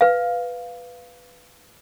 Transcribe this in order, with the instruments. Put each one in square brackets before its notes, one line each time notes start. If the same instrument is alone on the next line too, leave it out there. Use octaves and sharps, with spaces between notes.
[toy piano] B4 F5